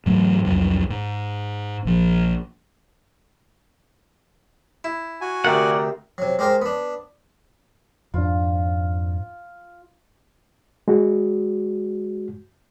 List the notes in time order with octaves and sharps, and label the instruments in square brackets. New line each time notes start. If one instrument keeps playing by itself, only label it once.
[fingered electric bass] G#2 E3 F#3 A3
C2 F2 F#3
G#2
A#1 F3
[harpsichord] E4
[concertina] F#4 G#5
[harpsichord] D2 C3 [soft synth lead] A#4 [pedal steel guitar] D5 F#5
[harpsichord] C3 F#3
G#3 G4 A#4 C5 G5
B3 D4
[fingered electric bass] F2 G#2 D4 [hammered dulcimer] F4
[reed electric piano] G#3 F#4